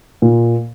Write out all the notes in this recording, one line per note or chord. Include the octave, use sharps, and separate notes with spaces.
A#2